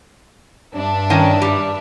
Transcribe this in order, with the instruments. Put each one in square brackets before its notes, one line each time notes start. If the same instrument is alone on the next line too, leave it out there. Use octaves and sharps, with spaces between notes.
[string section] G2 D4 E5
[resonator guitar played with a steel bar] D#3 C#4
G3